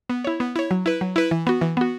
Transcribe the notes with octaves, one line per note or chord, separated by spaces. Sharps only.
B3
E4 C#5
B3
E4 C#5
F#3
E4 B4
F#3
E4 B4
E3
B3 F#4
E3
B3 F#4